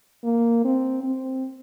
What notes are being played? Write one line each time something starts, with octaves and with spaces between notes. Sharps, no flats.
A#3
C4
C4